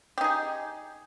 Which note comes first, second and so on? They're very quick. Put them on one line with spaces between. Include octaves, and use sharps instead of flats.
G4 D#4 G#4